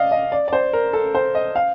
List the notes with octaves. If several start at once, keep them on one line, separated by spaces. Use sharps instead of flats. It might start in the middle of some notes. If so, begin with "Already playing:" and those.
Already playing: D5 D#5 F5
D#5
D5
D5
C5
A#4
A4
C5
D#5
F5